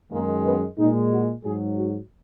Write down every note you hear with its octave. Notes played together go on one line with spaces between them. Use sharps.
F#2 D#3 G#3 A#3
B3
A#2 G#3 D#4
F#4
G#2 F#3 G#4
F#4